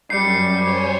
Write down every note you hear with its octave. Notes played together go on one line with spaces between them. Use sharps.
F#2 G3 C7 C#7
C5 C#5 G#5